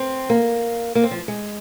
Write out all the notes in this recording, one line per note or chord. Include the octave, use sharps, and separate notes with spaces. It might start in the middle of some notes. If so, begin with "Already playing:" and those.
Already playing: C4
A#3
A#3
C4
F3
G#3